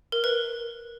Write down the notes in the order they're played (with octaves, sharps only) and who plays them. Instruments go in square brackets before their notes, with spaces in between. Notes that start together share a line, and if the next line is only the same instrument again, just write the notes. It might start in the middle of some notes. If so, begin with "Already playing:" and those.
[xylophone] A#4
B4